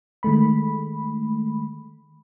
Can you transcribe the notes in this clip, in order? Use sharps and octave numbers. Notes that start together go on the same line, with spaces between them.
D#3 G#3 A3 B5